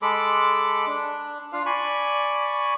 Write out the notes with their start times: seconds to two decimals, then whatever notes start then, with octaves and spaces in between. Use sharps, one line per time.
0.02 G#3 A4 B5 D6
0.87 D4
1.53 D4 F4 F5
1.66 D5 G#5 B5 C#6